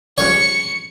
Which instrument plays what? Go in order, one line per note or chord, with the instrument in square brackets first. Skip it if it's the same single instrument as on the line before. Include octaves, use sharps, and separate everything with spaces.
[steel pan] C#3 F3 G3 [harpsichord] C#5 [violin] C#7